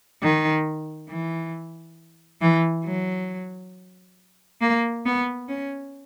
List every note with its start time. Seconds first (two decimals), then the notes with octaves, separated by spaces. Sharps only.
0.22 D#3
1.09 E3
2.41 E3
2.85 F#3
4.61 A#3
5.05 B3
5.48 C#4